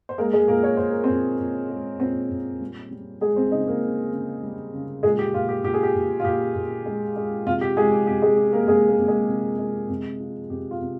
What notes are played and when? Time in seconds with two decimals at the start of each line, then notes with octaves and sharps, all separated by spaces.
0.09 C5
0.18 G#3 A#3 A#4
0.33 G#3 G#4
0.48 A#2 A#3 A#4
0.63 C#5
0.77 A#2 C5
0.90 A#4
1.04 C4 C5
1.09 A#2
1.40 A#2
1.70 G#3
2.00 A#2 C4 C5
2.30 A#2
2.60 G3
2.91 G3
3.21 G3 G#3 G#4
3.36 C4 C5
3.52 C#3 D#4 D#5
3.67 A#3 A#4
3.82 C#3
4.12 C#3
4.43 G3
4.73 C#3
5.03 A#2 G#3 G#4
5.19 G4
5.34 A#2 F4
5.49 G4
5.64 A#2 G4
5.74 G#4
5.83 G4
5.95 A#2
6.20 F4
6.25 A#2 G4
6.55 A#2
6.86 G#3
7.16 G#3
7.46 C3 F4
7.61 G4
7.77 F3 G#3 G#4
7.91 G4
8.07 C3 G4
8.22 G#3 G#4
8.37 F3 G4
8.53 A#3 A#4
8.68 C3 G#3 G#4
8.88 A#3 A#4
8.98 C3
9.08 G#3 G#4
9.28 C3
9.59 G#3
9.89 C3
10.20 F3
10.50 C3 G4
10.71 F4
10.81 C3